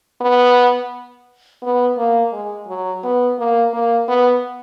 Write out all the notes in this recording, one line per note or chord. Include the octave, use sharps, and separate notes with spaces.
B3
B3
A#3
G#3
F#3
B3
A#3
A#3
B3